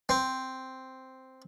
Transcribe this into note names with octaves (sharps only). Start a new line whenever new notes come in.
C4